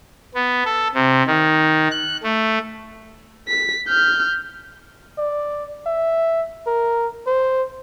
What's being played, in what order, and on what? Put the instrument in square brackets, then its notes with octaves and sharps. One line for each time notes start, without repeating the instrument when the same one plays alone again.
[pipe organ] B3
A4
C3
D#3
F#6
A3
[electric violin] B6
F6 G6
[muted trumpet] D5
E5
A#4
C5